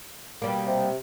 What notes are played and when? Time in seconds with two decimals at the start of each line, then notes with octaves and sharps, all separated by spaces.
0.42 B2 G3 A#3
0.67 C3